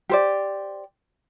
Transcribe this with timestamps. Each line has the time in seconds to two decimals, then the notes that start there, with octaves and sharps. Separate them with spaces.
0.09 G4 C5 D5